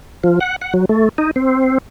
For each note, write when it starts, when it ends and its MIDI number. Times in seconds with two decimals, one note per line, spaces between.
0.24 0.39 53
0.41 0.56 78
0.61 0.73 78
0.74 0.85 54
0.89 1.09 57
1.18 1.31 63
1.36 1.78 60